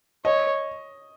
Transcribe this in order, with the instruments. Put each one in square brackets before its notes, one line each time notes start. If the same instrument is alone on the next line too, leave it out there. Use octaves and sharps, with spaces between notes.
[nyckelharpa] C#5 [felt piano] D#5